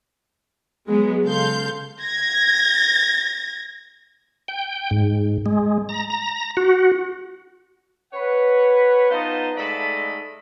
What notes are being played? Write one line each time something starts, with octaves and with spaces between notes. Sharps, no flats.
F#3 G#3 B3
C#3 A4 F5 C6 G6
G#6 A#6
G5
G#2
G#3
A#5
A#5
F#4
B4 C#5 F#5
B3 D#4 F4 C5 D#5 A5
G#2 A3 A4 D5 D#5 B5